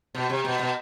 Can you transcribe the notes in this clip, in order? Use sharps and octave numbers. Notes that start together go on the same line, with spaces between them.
B2
C3
B2
B2